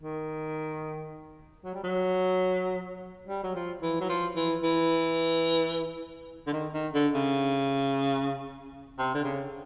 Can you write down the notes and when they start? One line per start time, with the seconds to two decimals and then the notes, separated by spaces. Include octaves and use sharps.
0.01 D#3
1.65 F#3
1.74 G3
1.84 F#3
3.28 G3
3.43 F#3
3.55 F3
3.82 E3
4.01 F#3
4.09 F3
4.36 E3
4.63 E3
6.47 D3
6.53 D#3
6.74 D#3
6.94 D3
7.14 C#3
8.99 C3
9.15 D3
9.25 C#3